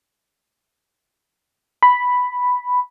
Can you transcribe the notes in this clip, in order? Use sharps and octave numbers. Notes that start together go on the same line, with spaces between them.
B5